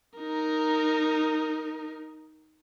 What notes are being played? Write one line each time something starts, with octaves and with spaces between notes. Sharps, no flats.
D#4 A#4